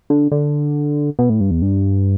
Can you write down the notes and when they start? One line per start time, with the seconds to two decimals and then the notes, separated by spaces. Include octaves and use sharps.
0.10 D3
0.32 D3
1.19 B2
1.30 A2
1.40 G2
1.51 E2
1.62 G2